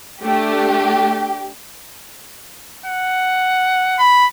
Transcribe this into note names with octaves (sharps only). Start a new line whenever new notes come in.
A3 D4 G4
F#5
B5